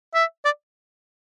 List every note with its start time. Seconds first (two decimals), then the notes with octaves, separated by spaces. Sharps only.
0.14 E5
0.45 D5